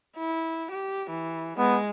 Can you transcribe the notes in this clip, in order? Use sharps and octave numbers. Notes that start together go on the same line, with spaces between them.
E4
G4
E3
G#3 B3